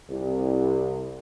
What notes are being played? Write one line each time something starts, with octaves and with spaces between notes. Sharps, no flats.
C2